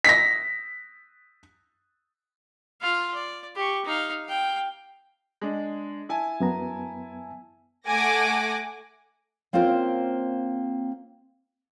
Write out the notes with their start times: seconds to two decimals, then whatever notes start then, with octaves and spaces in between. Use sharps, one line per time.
0.04 A#6 B6
2.81 F4 F5
3.14 D5
3.56 G4 C#6
3.85 D#4 F5
4.26 F5 G5
5.41 G#3 D4
6.09 E4 G#5 A5
6.40 F#2 B3 A#5
7.87 A3 F#5 G#5 D6 A#6
9.53 A#3 C4 C#4 F4 A#4 C5